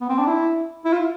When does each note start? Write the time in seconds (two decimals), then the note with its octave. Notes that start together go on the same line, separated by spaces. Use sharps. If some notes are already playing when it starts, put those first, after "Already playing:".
0.01 B3
0.09 C4
0.18 D4
0.27 E4
0.85 E4
0.93 F4